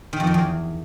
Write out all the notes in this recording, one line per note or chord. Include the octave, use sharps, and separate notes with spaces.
D#3
F2
D#3
E2